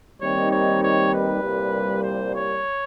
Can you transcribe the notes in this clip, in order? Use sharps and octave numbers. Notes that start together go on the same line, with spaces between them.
D#2 D#3 G3 C4 D#4 C#5
C#5
C#5
B4
C2 A#2 G3
C5
C#5